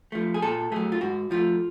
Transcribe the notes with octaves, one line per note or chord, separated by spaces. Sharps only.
F3 A3
G#4
A#2 A4
F#3 A3 G#4
F4
G#2 F#4
F3 A3 F4